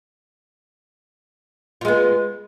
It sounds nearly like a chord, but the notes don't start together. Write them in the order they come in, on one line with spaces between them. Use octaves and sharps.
F4 G#3 B3